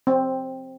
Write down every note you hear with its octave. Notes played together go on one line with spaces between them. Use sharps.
C4